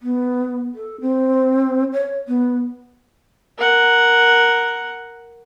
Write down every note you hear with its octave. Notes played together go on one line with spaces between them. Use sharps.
B3
A4
C4
C#5
B3
A#4 F#5